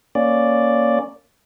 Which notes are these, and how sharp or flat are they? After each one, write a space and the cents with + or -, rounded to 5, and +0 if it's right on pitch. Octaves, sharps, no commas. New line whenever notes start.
A#3 +0 C#4 +0 D5 +0